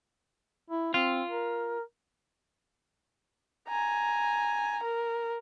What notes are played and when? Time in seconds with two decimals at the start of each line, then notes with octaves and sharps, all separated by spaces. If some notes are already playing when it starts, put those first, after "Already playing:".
0.70 E4
0.94 C4 F4
1.30 A#4
3.68 G#5 A#5
4.83 A#4